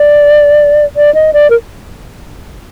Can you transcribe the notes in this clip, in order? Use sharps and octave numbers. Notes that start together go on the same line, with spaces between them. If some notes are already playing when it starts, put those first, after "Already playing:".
Already playing: D5
D5
D#5
D5
A#4